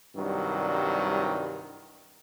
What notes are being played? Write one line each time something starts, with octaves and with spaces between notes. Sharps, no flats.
C2 G2 D#3 F#3